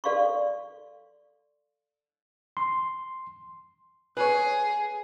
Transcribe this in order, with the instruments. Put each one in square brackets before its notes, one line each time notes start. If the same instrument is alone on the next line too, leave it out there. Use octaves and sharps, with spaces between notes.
[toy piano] A4 D5 F5 C6 C#6
[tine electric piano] C6
[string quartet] G#4 [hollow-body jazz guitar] B4 C#5